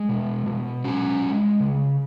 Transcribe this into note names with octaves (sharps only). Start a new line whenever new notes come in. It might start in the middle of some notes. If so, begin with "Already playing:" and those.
Already playing: G#3
B2
B2
G#3 C#4 F#4
G#3
C#3